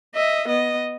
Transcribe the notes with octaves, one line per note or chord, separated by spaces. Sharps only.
D#5 E5
B3 D#5